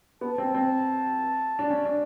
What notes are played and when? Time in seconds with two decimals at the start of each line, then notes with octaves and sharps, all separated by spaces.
0.21 B3 A5
0.38 C4
0.55 C4
1.59 D4
1.70 C#4
1.85 D4